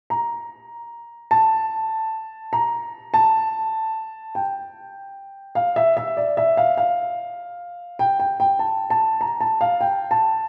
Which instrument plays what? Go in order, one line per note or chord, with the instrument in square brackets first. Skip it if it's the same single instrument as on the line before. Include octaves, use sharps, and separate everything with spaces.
[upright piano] A#5
A5
A#5
A5
G5
F5
E5
E5
D5
E5
F5
F5
G5
G5
G5
A5
A5
A#5
A5
F5
G5
A5